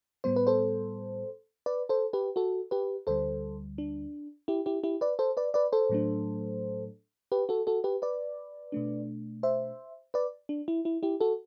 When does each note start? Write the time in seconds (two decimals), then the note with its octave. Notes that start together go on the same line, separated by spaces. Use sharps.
0.24 A2 G3 B3 C5
0.36 B4
0.47 A4 C5
1.66 B4 D5
1.89 A4 C5
2.13 G4 B4
2.36 F#4 A4
2.71 G4 B4
3.07 D2 D3 G3 A4 C5
3.78 D4
4.48 E4 G4
4.66 E4 G4
4.84 E4 G4
5.01 B4 D5
5.19 A4 C5
5.37 B4 D5
5.54 B4 D5
5.72 A4 C5
5.89 A2 F#3 A3 D4
7.32 G4 B4
7.49 F#4 A4
7.67 F#4 A4
7.84 G4 B4
8.02 B4 D5
8.72 B2 A3 D4
9.43 C5 E5
10.14 B4 D5
10.49 D4
10.68 E4
10.85 E4
11.03 E4 G4
11.20 F#4 A4